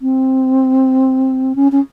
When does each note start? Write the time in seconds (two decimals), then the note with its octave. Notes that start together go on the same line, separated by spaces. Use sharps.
0.02 C4
1.55 C#4
1.72 C#4